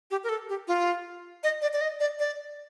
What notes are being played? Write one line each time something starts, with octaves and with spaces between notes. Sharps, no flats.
G4
A#4
A4
G4
F4
D#5
D5
D5
D#5
D5
D5